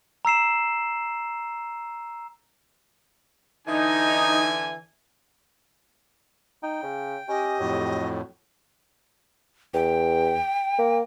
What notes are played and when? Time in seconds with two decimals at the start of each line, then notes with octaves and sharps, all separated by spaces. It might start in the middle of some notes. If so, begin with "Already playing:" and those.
0.25 A#5 E6 C7 E7
3.68 D3 E3 D#4 G#5
6.63 D#4 G5
6.83 C#3
7.28 C#4 G4 D#5
7.60 F2 A2 F#3
9.74 E2 G5
10.78 A#3